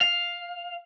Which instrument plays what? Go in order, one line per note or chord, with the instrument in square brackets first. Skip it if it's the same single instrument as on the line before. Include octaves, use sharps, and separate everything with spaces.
[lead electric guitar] F5